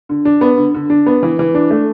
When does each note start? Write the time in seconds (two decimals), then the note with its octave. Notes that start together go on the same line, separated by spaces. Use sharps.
0.09 D3
0.25 D4
0.41 B3
0.57 D3
0.74 D3
0.90 D4
1.06 B3
1.23 E3
1.39 E3
1.54 D4
1.70 A3